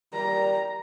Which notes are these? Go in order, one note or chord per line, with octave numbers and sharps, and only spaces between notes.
G3 A#4 A#5